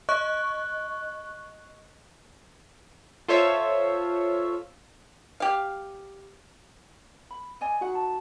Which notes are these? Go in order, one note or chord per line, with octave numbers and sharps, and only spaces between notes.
D#5 C#6 F#6
F4 A4 C5 C#5 E5
G4 F5
B5
D5 D#5 G#5
D#4 F#4 F#5
A5